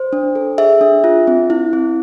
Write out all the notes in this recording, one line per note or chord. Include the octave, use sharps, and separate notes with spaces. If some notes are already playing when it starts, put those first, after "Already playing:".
Already playing: C5
D4
A4
G#4 E5
D4
F4
C4
E4
C4